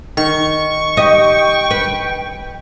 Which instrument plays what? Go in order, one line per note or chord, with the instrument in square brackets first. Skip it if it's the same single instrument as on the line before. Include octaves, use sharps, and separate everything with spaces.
[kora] D#3 [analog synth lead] C#6
[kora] G4 [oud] D#5 [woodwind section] G5
[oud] B4